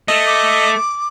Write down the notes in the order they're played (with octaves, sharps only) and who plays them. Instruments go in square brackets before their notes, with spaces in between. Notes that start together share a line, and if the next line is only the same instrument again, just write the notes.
[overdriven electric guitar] A3 [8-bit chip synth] D#5
[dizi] D6